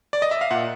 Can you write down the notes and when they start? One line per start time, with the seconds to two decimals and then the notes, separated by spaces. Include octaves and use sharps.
0.13 D5
0.22 D#5
0.31 E5
0.41 F5
0.51 A#2 F#5